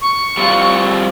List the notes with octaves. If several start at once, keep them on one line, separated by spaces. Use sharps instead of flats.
C#6
G3 C4 F4